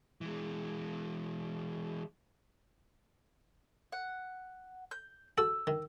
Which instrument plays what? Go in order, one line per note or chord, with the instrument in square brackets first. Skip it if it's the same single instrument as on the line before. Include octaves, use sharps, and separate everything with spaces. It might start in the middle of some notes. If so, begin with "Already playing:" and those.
[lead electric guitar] E3 G#3
[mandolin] F#5
G6
[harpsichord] F#4 A4 [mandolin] E6
[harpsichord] D#3